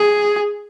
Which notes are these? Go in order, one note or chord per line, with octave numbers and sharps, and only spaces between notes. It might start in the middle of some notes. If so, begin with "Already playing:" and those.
Already playing: G#4